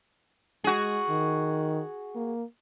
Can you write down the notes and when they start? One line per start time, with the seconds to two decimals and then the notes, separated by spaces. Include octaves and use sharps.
0.64 G#3 F#4 G#4
1.10 D#3
2.16 A#3